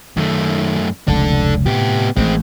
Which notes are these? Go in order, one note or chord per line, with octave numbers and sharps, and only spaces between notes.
F#2 D#3 A3
F1 C#2 D4 A4
A2 C3 B3 G4
A1 E3 G#3 A3 C4